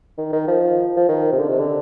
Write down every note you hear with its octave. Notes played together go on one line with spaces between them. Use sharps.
D#3
D#3
F3
F3
D#3
C3
D3
C3
D3